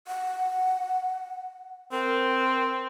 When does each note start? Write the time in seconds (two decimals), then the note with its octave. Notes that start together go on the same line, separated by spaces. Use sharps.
0.07 F#5
1.92 C4 A#4